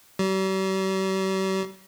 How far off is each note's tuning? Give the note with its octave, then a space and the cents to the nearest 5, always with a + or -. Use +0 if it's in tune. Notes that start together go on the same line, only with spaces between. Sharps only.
G3 -45